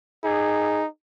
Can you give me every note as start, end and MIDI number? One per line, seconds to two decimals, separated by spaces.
0.24 0.87 63
0.24 0.84 68